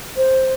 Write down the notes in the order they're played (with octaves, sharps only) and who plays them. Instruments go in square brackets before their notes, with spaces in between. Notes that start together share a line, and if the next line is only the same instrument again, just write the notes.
[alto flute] C5